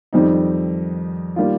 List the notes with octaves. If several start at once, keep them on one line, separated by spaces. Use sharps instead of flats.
F2 D#3 G3 C4 D#4
D#3 G3 A#3 F4